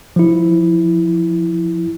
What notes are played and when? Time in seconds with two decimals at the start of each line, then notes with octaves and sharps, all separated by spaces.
0.16 F3 E4